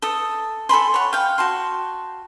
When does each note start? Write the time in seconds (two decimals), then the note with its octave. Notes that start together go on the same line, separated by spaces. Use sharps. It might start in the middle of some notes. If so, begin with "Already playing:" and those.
0.02 A4 D#6
0.69 A4 G#5 B5 C6
0.94 C#5 F#5
1.13 F5 G5
1.38 F#4 A5 C6